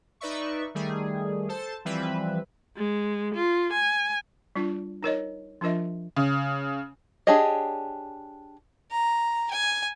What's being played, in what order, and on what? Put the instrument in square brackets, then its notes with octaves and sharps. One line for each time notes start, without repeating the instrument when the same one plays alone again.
[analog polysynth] D#4 B4 D5 E5 C#6
D#3 G3 A3 G#4
A4 C5 A5
E3 F3 G3 C4 B4 E5
[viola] G#3
F4
G#5
[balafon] G3 D4 F4 D5
D#4 A#4 C#5 D#5
F3 D4 F4 A#4 D#5 E5
[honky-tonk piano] C#3
[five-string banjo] D4 G4 G#4 C#5 D#5
[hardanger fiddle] A#5
G#5